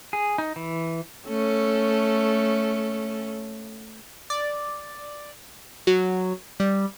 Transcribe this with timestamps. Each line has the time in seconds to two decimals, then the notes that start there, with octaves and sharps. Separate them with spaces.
0.13 G#4
0.38 D#4
0.56 E3
1.28 A3 C#4 A4
4.30 D5
5.87 F#3
6.60 G3